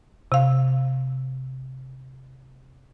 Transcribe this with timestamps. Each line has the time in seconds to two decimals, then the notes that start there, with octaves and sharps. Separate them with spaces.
0.32 C3 F5